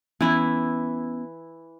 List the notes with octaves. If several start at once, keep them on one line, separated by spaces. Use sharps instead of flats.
E3 B3 C#4 E4